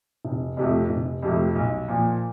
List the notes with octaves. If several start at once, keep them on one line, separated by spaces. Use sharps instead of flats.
F1
F2 C3 F3 A3
F1
F2 C3 F3 A3
B1
A#2 F3